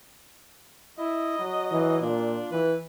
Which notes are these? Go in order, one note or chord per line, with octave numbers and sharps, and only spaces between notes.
E4 D#5
F#3
E3
A#2 D4 F4
E3 B4